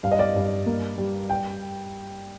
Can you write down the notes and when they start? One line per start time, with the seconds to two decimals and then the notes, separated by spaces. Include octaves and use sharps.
0.03 G2 F5
0.12 D#5
0.19 D5 F5
0.35 G2
0.66 A#3
0.98 G3
1.30 G5